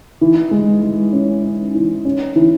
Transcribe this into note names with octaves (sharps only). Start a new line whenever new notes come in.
E3
G#3
G#3
C#4
C#4
E3
C#4
E3